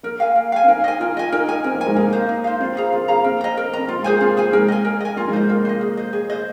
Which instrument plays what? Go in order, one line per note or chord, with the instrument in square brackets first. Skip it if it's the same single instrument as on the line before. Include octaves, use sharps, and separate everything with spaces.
[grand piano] A#3 [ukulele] A#4
[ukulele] F5 G#5
A#4
F5 G#5
[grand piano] C4
[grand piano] D#4 [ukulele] A#4
[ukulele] D#5 G#5
[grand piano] F4 [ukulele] A#4
[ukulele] D#5 G#5
[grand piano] D#4 [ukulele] A#4
[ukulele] G#5
[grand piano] C4 [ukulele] A#4
[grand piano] A#3
[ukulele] G#5
[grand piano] G#3
[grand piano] A#3 [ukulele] D#4
[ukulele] C5 F5
D#4
C5 F5
[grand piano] C4 [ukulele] F4
[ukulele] G#4 F5 A#5
[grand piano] A#3 [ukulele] F4
[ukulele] G#4 F5 A#5
[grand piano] C4 [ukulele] A#4
[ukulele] D#5 A#5
A#4
[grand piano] A#3
[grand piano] C4 [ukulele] D#5 A#5
[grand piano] A#3 [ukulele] F4
[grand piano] G#3
[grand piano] A#3 [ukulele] G#4 C5 G#5
[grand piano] C4 [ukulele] F4
[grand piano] A#3 [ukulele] G#4 C5 G#5
[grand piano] G#3 [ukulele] A#4
[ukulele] D#5 G#5
A#4
D#5 G#5
[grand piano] A#3 [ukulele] F4
[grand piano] G#3
[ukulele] C5 D#5
[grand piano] A#3 [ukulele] F4
[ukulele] C5
D#5
G#4
C5 D#5
G#4
C5 D#5